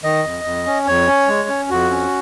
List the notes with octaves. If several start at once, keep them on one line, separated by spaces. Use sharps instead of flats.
D#3 D#5
F2
F2
C#4
F2 C#5
C#4
G#3
C#4
F2 F#4
C#4